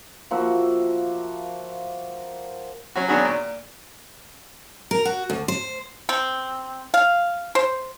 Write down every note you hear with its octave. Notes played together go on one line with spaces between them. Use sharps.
F3 A#3 F#4 E5
F#3 C#4 F#4
D#3 F#3 B3 D4 F#4 G#4
A#2
A#4
F#4
D2
C5
C4
F5
C5